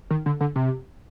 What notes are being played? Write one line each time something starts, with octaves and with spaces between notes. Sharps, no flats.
D#3
D3
D3
C3